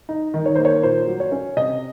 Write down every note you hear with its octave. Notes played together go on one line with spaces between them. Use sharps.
D#4
D#3
C#5
A#3 C5
C#5
A#2 C5
F#3
C#5
C#4
C3 D#5